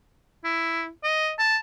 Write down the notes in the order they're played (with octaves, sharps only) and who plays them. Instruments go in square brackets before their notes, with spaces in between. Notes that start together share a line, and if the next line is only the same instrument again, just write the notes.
[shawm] E4
D#5
A5